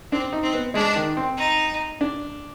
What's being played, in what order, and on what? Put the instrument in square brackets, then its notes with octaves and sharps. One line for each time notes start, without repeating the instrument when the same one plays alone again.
[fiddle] C4 [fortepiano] D4
[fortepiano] D#4
[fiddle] C4
[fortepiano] B3
[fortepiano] G#3 [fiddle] D4
[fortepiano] D#3
C4
[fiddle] D#4
[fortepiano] D4